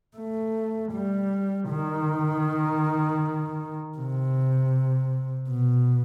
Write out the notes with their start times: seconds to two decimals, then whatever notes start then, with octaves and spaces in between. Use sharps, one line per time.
0.17 A3
0.92 G3
1.69 D#3
3.97 C3
5.49 B2